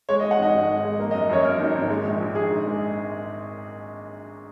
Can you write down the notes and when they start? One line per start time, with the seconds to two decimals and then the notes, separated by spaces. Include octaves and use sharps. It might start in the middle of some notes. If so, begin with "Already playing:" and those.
0.09 G#3 C#5
0.20 D#5
0.23 G#3
0.31 F#5
0.39 G#1 D#5
0.54 G#1
0.69 G#3
0.84 G#3
1.00 A#3
1.11 D#5
1.14 F#2
1.29 F#2 C#5
1.44 A#3 A#4
1.59 G#1
1.75 G#1
1.90 G#3
2.05 A#1
2.20 A#1
2.35 A#1 G#4
2.50 G#2
2.66 G#3